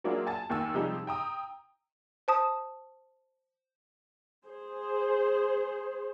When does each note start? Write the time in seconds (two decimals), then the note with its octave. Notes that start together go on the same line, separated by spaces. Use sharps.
0.04 F#3 A#3 D4 E4 F4 G#4
0.27 G#5 A5 A6
0.50 D#2 D#3 G#5 E6
0.74 C3 F3 G3 D#4 G4 G#4
1.07 G5 A#5 D#6
2.28 C5 A5 D#6
4.46 G#4 C5